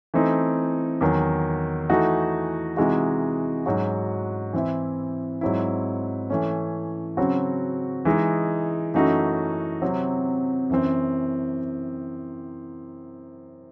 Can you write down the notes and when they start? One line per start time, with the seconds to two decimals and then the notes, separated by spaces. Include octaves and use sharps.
0.14 E3 A3 C4 D#4
1.01 E2 D#3 F#3
1.90 E3 A3 D#4 F#4
2.77 C3 E3 G#3 D#4 F#4
3.66 G#2 F#3 C#4 F#4
4.53 E3 C4 E4
5.41 G#2 F#3 C4 E4
6.30 E3 A3 C#4
7.17 C#3 F#3 C4 F#4
8.05 E3 G#3 D#4
8.94 F#2 E3 A3 D#4 F#4
9.82 C3 F#3 C4
10.69 F#2 E3 C4